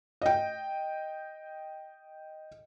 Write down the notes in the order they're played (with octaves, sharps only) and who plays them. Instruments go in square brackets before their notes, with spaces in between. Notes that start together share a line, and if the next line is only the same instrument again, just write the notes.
[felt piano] D#5 G5